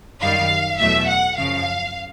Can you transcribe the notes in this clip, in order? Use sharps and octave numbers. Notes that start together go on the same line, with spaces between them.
F#2 D#3 G3 F5
E2 B2 F#3 A3 E5
F#5
F#2 C#3 F3 F5